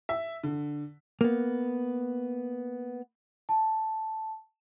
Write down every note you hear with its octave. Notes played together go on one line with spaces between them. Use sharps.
E5
D3
A#3 B3
A5